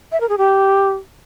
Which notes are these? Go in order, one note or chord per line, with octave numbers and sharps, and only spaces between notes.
E5
A#4
G#4
G4